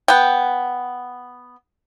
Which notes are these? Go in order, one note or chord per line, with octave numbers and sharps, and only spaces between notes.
B3 G5